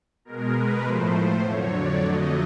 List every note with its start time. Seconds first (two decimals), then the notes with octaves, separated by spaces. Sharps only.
0.25 B2 G#3 A#4
0.55 B4
0.83 A2 F3 A3 C5
1.43 F2 D3 F#3 C#5
1.73 D5
2.02 F2 D3 F#3 A3 D#5